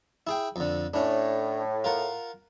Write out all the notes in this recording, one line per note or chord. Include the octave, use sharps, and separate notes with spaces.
E4 G#4 G5
F2 D3
A2 C#4 D4
F4 A#4 F#5